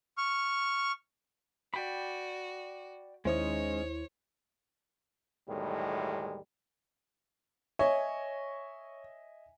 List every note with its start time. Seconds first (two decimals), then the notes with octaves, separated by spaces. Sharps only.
0.18 C#6 F6
1.74 F#4 D5 G5 B5
3.25 D#2 G#3 C#4 D#4 E4 C5 C#5
5.49 B1 E2 A2 D#3 G3 G#3
7.79 C#5 D#5 E5 G#5